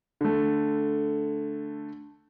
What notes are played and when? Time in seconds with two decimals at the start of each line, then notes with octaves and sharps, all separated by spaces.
0.21 D3 A3